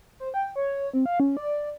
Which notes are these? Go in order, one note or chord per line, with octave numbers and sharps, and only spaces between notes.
C5
G5
C#5
C4
F5
C#4
D5